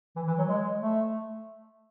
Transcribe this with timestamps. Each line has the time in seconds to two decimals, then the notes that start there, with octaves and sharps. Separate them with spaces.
0.16 E3
0.27 E3
0.38 F#3
0.49 G#3
0.81 A3